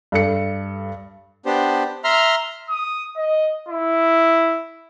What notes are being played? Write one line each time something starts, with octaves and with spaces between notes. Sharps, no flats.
G2 A4 C#7
B3 D4 G4 C5
E5 A#5 C6 F6
D#6
D#5
E4